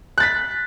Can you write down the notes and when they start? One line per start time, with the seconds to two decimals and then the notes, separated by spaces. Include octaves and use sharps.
0.18 F#6
0.20 A6
0.23 B6